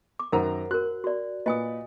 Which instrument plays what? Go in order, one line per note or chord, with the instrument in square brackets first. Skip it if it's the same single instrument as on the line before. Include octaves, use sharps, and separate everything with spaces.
[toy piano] D6
[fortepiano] F#2 D#3 A#5 [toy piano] A#4 C5 F#5
[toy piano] F#4 A#4 [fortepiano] F#6
[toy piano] F#4 D5
[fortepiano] A#2 B4 [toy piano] D#5 G#5 D#6